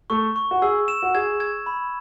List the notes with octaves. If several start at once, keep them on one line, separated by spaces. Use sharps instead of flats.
A3 A4 C#6
C#6
F#4
G#4 E6
E7
F#4
G#4 G#6
G#6
B5